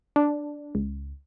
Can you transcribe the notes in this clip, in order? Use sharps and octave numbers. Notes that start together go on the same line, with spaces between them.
D4
C#2